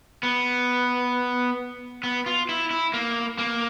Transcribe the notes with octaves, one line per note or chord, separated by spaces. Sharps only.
B3
B3
F4
E4
E4
A#3
A#3